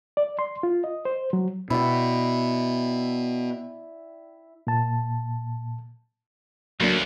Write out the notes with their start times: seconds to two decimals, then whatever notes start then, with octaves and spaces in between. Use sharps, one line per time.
0.17 D5
0.39 C6
0.63 F4
0.84 D#5
1.05 C5
1.33 F#3
1.70 B2 E4 D5 G5
4.67 A#2 A5
6.80 D2 F#3 A#3 D4